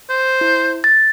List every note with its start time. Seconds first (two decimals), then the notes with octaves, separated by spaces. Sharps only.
0.09 C5
0.41 E4
0.84 A6